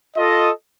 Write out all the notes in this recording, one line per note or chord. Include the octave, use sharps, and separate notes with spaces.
F4 A4 D#5